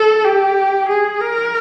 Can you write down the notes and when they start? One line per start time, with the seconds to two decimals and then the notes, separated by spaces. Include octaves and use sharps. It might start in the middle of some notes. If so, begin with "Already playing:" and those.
Already playing: A4
0.24 G4
0.88 G#4
1.21 A#4